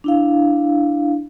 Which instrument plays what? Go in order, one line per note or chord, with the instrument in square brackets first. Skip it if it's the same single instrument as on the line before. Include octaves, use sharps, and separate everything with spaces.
[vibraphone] D4 E4 F5